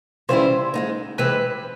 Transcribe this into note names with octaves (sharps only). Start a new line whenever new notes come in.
C#3 E3 G3 C4 E4 C5
G#3 B3 D#4
C3 E3 G#3 C4 B4